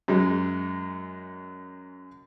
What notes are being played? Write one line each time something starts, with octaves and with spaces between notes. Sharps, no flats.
F#2 F#3 G#3